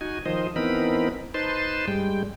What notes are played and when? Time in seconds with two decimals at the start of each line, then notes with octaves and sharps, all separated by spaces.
0.01 D#4 F#4 G#5
0.26 D#3 F3 C5 D#5
0.56 E3 B3 C4 D#4 A#4 B5
1.34 D#4 B4 C5 A5 C6
1.88 G2 G3 G#3 G5